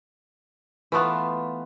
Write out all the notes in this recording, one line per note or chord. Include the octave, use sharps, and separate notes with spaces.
E3 A3 B3 F4